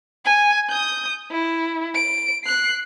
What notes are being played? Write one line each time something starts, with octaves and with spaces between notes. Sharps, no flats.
G#5
D#6 G6
E4
D7
F#6 C7